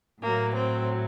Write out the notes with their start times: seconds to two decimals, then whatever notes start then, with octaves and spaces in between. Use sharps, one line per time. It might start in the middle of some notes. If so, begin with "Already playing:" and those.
0.20 A2 F#3 A#3
0.54 C4